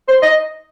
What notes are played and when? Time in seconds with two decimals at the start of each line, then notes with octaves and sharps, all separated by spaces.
0.08 C5
0.22 D#5